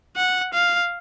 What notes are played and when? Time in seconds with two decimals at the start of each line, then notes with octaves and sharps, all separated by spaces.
0.16 F#5
0.53 F5